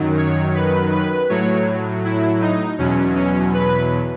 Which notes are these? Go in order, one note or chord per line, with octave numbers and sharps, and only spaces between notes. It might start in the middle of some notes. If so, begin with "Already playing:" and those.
Already playing: F#2 D#3 F#3
C#5
B4
B4
A2 F#3 C#5
E4
D#4
E2 B2 F#3 C#4
C#4
B4